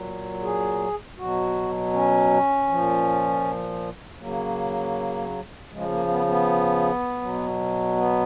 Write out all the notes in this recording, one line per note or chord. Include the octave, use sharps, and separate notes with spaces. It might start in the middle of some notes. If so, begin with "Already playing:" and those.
Already playing: A#2 F#3
G#4
B2 F#3 F#4
C#4
A#2 F3
C#3 F#3 A#3
C#3 F3 G#3
A#3
B3
B3
B2 F#3
B3